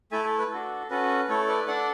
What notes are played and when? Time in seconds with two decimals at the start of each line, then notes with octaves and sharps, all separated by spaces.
0.11 A3 E4 A4 E5 G#5
0.25 A4
0.38 B4
0.50 D4 F#4 A4
0.90 C#4 F#4 A4 B4
1.29 A3 E4 A4 C#5
1.48 B4 D5
1.68 D4 A4 D5 F#5